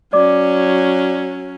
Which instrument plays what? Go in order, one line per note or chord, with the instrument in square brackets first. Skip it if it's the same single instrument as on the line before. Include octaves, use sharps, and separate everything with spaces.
[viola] F#3 C#4 [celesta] D5 D6